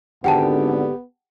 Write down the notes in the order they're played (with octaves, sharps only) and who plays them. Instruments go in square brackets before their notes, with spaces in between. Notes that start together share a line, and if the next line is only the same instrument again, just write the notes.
[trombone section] G#1 D3 [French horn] B3 [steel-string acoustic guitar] G4 D5 [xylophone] F#5 G5 A5